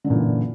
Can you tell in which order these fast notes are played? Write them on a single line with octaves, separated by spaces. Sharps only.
D3 F#2 A#2 E3